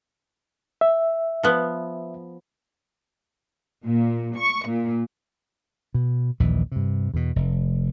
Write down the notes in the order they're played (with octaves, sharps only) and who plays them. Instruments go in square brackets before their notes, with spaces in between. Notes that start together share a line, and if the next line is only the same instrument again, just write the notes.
[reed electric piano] E5
[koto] F3 B3
[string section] A#2
C#6
A#2
[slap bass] B2
A#1 D#2 E3
G2 C3
E2 B2
F1